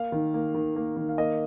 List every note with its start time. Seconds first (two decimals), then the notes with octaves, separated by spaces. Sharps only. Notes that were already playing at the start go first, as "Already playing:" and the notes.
Already playing: A#3 F5
0.12 D#3
0.34 A#3
0.54 D#3
0.76 A#3
0.96 D#3
1.09 F5
1.18 A#3 D#5